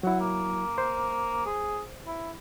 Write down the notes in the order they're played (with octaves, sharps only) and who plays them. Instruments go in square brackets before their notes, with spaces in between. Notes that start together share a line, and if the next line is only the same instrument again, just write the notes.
[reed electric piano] F#3 E4 [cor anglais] F#5
[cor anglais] A#3
[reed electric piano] C5
[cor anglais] G#4
E4